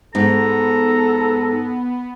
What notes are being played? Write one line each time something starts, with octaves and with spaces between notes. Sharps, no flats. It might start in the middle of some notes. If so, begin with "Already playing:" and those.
G#2 B3 A4 A#5